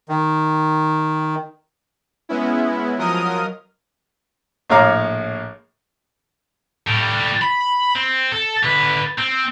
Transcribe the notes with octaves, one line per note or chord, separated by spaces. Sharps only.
D#3
G#3 B3 C#4 E4
F3 F#3 A#4 D#5 D#6 F6
A#1 A2 C#5 F5 A#5 D6
A2 G3
B5
C4
A4
D3 B4
C4